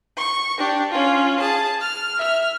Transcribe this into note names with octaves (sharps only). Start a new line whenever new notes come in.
C#6
D4 G4
C#4 F4
G#4 A5
F6
E5 F6